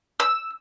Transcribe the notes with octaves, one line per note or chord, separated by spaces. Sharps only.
E6